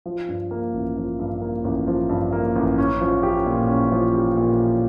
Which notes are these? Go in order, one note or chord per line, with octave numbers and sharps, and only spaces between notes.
F3
G2
A#3
A1
F3
G2
A#3
A1
F3
G2
A#3
A1
C#4
F3
G4
A#2
C#4
F3
G4
A#2
C#4